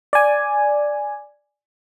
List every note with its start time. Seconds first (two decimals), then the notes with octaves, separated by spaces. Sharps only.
0.13 D5 G#5